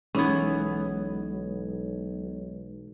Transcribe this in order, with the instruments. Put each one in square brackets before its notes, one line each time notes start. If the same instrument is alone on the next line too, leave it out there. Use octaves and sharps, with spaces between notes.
[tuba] B1 [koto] E3 B3 [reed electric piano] G#3 C#5 G#6 [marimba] C#4 D#4